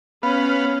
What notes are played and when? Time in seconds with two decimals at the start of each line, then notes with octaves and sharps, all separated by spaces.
0.23 B3 C#4 F5 B5